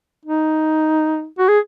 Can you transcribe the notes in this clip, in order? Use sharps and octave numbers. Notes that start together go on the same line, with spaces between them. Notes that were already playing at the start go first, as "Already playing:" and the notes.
D#4
F#4
G#4